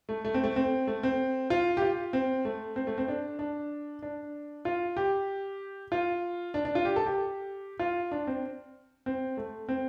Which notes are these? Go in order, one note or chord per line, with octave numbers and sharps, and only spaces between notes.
A3
A3
C4
A3
C4
A3
C4
F4
G4
F4
C4
A3
C4
A3
C4
D4
D4
D4
F4
G4
F4
D4
D4
F4
G4
A4
G4
F4
D4
C4
C4
A3
C4